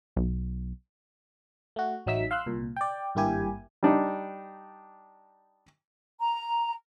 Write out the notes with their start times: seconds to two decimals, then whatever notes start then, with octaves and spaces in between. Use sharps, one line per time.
0.16 B1
1.76 A3 F#4
2.06 A1 F#3 D#4 E5 E6 B6
2.31 F5 C6 E6 F#6
2.46 C2 A#2
2.76 D5 G5
3.15 G#1 G2 A#3 E4 G4 G#5
3.83 G3 D4 D#4
6.18 A#5